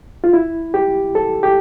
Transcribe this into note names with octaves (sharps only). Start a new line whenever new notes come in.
F4
E4
G4
A4
G4